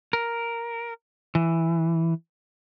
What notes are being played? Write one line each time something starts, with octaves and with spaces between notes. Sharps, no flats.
A#4
E3